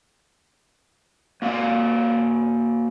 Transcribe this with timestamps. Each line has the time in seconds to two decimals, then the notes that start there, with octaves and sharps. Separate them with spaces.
1.42 A#3 F#4 D5 F5